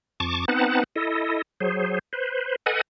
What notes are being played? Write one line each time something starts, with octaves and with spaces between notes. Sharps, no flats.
F2 A5 C#6 D6
B3 C4 D#4 B4 F#5 A5
E4 A4 D#5
F#3 G#4 C5
B4 C5
A4 B4 D#5 F#5 G#5